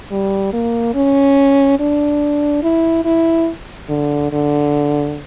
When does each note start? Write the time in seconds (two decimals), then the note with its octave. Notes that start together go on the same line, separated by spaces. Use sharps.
0.11 G3
0.53 A#3
0.94 C#4
1.79 D4
2.63 E4
3.05 E4
3.89 D3
4.32 D3